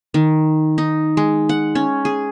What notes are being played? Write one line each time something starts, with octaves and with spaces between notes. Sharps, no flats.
D#3
D#4
G#3
F#5
C#4
G#4